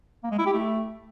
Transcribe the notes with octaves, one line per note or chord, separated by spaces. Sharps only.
A#3
G#3
E4
G4
A3